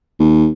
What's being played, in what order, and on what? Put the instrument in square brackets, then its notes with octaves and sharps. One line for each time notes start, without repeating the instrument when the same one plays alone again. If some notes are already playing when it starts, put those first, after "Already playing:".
[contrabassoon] D#2